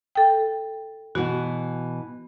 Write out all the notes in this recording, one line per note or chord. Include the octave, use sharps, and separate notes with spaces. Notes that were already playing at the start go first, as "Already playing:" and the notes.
A4 G5
B2 E3 F#4